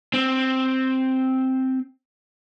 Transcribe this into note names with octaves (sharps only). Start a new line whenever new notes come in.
C4